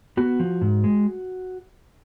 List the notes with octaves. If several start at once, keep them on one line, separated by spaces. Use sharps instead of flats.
B3 F#4
F3
G#2
G#3